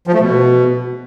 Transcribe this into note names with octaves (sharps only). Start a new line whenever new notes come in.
F3
A3
B2